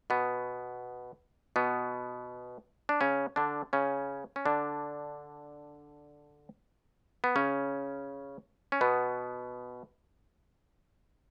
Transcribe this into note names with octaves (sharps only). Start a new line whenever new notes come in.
B2 B3
B2 B3
D4
C#3 C#4
D3 D4
C#3 C#4
C#4
D3 D4
B3
C#3 C#4
C#4
B2 B3